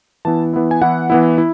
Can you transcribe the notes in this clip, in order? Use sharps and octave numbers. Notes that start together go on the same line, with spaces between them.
E3 B3 E4 A5
E3 B3 E4
G#5
E3 B3 E4 F#5
E3 B3 E4
E4